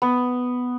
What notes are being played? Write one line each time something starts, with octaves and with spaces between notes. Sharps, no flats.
B3